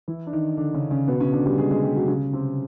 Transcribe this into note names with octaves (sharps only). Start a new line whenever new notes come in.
E3 E4
D4
D#3 D#4
D3 D4
C#3 C#4
C#3 C#4
B2 B3
C#3 C#4
D3 D4
G3 G4
G#3 G#4
G#3 G#4
G3 G4
F#3 F#4
C#3 C#4
C3 C4